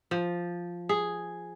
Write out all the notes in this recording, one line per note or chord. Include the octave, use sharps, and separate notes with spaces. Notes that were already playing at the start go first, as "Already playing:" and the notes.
F3
G#4